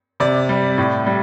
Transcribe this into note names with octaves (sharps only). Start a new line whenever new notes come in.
C3 D5
G3
A2
G3